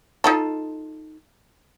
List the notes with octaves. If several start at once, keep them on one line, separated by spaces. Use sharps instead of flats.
D#4 F4 A4